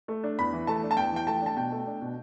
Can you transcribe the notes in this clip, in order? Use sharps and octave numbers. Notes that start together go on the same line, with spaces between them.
A3
D4
E2 B5
E3
A3 A5
D4
A5
E2 G5
E3 G5
A3 A5
D4 A5
B2 G5
A3
D4
B2